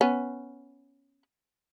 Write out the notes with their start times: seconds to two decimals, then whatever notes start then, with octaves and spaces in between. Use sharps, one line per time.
0.01 B3 C#4